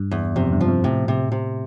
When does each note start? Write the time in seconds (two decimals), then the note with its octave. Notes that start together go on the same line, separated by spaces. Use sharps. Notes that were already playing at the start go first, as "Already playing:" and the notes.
Already playing: G2
0.11 E2
0.36 F2 C3
0.52 G2
0.61 F3
0.68 F2
0.84 A2 C3
1.08 C3
1.32 C3